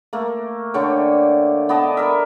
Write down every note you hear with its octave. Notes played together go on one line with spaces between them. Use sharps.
A3 A#3
D3 D4 C#5 G5
B3 D5 D#5 A5
A#4 E5